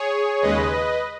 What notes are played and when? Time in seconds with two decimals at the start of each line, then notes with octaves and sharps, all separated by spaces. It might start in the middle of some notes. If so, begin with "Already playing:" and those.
Already playing: G#4 C#5
0.42 D#2 C#3 G#3 B4 D#5